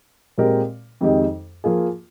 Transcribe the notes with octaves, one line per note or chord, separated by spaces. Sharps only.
A#2 G#3 C4 G4 A#4
F2 D#3 G#3 D#4 G4
F3 A#3 F4 G#4